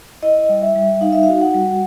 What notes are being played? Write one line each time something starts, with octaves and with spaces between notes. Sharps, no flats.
E4 D#5
G3
E5
G3
D#4 F5
E5
F5
F#4
F#5
G3